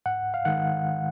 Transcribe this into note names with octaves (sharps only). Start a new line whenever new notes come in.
G#2 F#5
F5
D#3 G#3 F#5